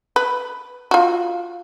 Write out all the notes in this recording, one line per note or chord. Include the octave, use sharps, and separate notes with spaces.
B4
F4 F#4